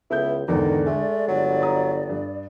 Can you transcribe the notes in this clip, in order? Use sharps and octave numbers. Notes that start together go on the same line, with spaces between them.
C#2 B3 E4 G6
E2 G#2 D3 D#3 D5
G#3 A3
G1 F#3
A#5 D#6
G2